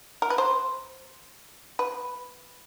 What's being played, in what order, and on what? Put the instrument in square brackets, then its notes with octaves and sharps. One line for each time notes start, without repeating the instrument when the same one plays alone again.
[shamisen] A#4
B4
C5
B4